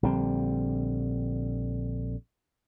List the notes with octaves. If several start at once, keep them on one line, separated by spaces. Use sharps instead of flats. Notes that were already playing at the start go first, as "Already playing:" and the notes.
A#1 D3 G3 C4